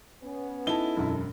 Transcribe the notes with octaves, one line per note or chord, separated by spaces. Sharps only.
B3 C#4
D#4 E4 A4 G7
E1 F#2